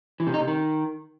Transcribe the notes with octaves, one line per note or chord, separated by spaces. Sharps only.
E3
C3
D#4
C3
D#3